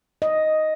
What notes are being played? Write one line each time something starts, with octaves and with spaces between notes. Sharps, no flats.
D#5